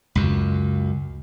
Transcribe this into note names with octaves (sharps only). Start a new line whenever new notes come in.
C#2 F#2